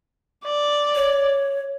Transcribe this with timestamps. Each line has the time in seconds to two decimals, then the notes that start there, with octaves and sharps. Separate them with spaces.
0.44 D5
0.95 C#5